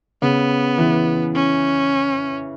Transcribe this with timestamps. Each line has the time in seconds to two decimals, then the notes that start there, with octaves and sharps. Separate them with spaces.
0.22 C#3 B3
0.78 E3
1.35 C#4